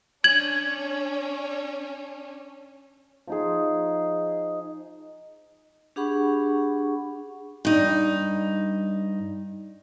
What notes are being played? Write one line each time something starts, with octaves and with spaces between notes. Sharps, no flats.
C#4 D4 G#6 F#7
F3 D#4 G#4
D4 G4 G#4 F#5 B5 C#6
G2 D#4